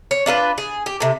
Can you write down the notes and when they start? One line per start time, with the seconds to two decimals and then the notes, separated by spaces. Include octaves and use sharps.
0.11 C#5
0.26 D4 F4 A4 B4
0.58 G#4
0.86 G4
1.00 A2 C3